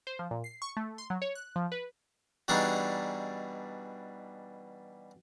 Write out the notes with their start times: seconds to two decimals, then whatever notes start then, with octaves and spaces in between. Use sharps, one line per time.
0.07 C5
0.19 F3
0.31 A#2
0.44 C7
0.62 C#6
0.77 A3
0.98 C6
1.10 F#3
1.22 C#5
1.35 F#6
1.56 F3
1.72 B4
2.48 B2 E3 G3 D4 D#4 G#4